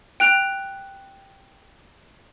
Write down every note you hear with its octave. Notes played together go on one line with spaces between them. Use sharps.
G5 F#6 F7